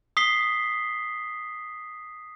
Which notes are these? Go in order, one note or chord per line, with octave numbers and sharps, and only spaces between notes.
D#6 B6 C7 G7